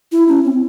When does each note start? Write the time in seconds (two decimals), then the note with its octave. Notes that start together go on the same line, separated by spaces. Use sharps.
0.12 E4
0.28 C#4
0.45 C4